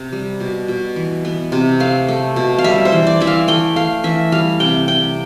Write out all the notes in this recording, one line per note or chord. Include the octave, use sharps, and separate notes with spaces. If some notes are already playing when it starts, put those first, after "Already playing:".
Already playing: C3
G3
B2
B2
E3
B3
C3
A3 F5
A3
B2
F5
G3 E5
C5
E3
D5
E3 E5
F5
A3 G5
A3 F5
E3 E5
G3 F5
C3 G5
C3 G5